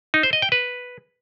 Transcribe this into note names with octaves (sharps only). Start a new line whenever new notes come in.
D#4
C5
D#5
G5
B4